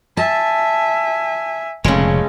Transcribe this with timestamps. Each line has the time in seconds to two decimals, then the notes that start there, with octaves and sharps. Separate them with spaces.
0.17 E5 G#5 A5
1.84 F1 A#2 C#3 G#3 C#4 A4